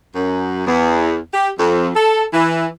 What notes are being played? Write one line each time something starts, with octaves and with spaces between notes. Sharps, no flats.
F#2
E2
G4
F2
A4
E3